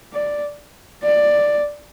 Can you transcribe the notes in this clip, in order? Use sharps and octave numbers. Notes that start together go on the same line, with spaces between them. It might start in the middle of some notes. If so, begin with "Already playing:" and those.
D5
D5